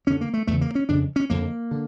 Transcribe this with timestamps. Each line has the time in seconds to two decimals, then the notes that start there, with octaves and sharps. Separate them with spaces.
0.07 F2 D3 C#4
0.21 A#3
0.34 A3
0.47 E2 C#3 A3
0.61 A#3
0.75 C#4
0.89 F2 C#3 D4
1.16 C#4
1.30 F2 D3 A#3
1.71 D3